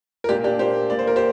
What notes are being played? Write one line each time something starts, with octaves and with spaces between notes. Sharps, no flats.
A#4
A#2 A#3 D4 G4
D4 G4
A#2 A#3 G4 C5
A#2 A#3 D5
C5
A#4
G4 C5